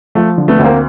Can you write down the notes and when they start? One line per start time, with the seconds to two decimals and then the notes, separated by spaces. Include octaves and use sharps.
0.15 F3 A3
0.38 D3
0.48 A3 B3
0.59 D2
0.64 A#3 C4